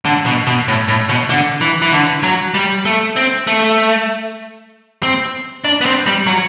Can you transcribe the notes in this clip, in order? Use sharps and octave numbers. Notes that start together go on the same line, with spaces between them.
D3
B2
B2
A2
A2
B2
D3
E3
E3
D3
F#3
G3
A3
C4
A3
C4
D4
B3
C4
G3
F#3